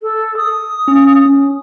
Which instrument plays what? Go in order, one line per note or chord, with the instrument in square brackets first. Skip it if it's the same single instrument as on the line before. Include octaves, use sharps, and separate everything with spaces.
[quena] A4
D#6
[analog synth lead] C#4
C#4